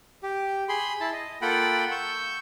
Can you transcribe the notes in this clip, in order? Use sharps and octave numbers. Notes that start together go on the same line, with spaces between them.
G4
G#4 B5 C6
E4 A5
D#5
A#3 F4 A4 F#5 G5 B5
C#6 E6 G6